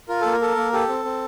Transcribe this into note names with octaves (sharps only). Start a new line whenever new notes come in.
F4 A#4
A#3 A4
A#4
A4
A#3
G4 A4
C4
C4